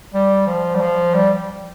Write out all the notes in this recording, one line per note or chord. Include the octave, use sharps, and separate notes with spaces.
G3
F3
G3
F3
G3